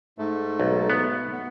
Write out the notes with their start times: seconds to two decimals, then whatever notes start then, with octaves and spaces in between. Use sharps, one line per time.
0.18 G#2 A3
0.60 B1
0.90 B3
1.32 B3